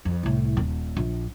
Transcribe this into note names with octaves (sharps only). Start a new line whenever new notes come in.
F2
C2 A2
D#1
A#1